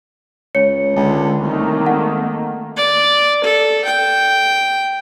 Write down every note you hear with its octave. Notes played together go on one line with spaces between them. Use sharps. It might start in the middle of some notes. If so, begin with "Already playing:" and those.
C#2 C#5 C#7
C#2 D3
C2 D#3 A3 A#3
G#1 F#5
D5
A4
G5